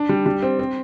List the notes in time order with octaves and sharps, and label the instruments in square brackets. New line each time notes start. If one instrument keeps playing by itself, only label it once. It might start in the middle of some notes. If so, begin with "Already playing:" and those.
Already playing: [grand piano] D4
G3
G3
C4
C4